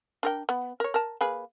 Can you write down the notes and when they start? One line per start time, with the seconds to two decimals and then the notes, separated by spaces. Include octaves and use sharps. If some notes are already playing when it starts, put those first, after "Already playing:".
0.23 D4 A#4 G5
0.49 B3
0.80 A#4 C#5
0.94 A#4 A5
1.21 A#3 G#4 B4